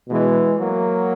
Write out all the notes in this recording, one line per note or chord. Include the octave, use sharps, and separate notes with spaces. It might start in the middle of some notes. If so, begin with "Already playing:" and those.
B2 E3 G#3
F#3 A#3